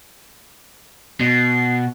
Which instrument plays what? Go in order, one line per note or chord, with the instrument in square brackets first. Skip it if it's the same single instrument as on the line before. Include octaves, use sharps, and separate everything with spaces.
[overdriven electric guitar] B2 [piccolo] C7